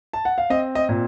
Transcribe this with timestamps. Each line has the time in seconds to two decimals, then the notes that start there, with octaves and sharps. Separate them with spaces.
0.13 A5
0.25 F#5
0.38 F5
0.50 C4 D#5
0.75 D#5
0.89 A#2